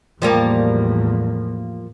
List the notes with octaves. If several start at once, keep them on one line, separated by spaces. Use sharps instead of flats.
E2 A2 F3 G3 A#3